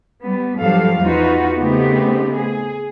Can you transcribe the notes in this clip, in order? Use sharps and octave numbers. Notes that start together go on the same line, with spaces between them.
G3 B3
G2 F3 F#3 G4 A4 F5
E2 D#4 F4 F#4 B4
C#3 A3 B3 C4 D#4 G4
G#4